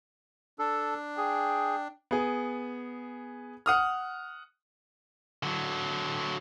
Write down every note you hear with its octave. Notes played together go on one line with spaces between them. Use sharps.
D4 A4
G#4 G5
B3 G#4
F#5 D#6 F6
D3 F#3